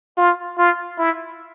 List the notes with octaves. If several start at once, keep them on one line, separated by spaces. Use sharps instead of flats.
F4
F4
E4